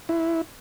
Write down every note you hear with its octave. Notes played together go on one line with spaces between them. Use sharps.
E4